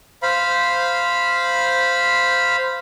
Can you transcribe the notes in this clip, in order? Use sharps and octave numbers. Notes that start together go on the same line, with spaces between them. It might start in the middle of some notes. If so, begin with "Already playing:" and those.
C5 F5 B5